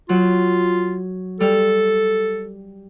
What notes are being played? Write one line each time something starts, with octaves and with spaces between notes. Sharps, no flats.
F#3 F4
G3 A4